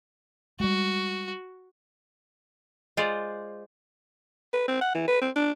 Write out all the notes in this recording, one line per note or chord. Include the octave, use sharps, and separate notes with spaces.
G3 G#3 F#4
G#3 F4 C5 D5
B4
C4
F#5
E3
B4
C4
D4